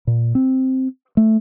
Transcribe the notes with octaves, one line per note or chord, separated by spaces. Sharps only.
A#2
C4
A3